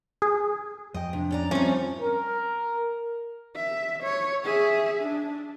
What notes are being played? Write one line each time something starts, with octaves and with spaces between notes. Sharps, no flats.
G#4
F2 D#5 G5
C3 D4
C#4 D5 A#5
F3 G3 C4 C#4 D#4 F4 E5
A#4
E5
C#5
G#4 E5
D4